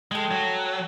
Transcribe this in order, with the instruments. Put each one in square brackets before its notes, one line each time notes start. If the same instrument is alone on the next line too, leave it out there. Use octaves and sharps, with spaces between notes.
[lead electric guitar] G#3 [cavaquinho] A4 G5
[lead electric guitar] F#3